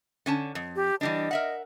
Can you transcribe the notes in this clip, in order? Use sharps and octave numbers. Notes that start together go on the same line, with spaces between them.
D3 C#4 A5
F2
G4
E3 G3 D4 D#5
A#4 E5 F#5